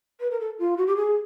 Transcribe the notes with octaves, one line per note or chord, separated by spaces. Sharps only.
B4
A#4
A4
F4
F#4
G4
G#4